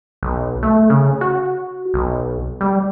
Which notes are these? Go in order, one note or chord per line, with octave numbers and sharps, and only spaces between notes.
B1
A3
C#3
F#4
B1
G3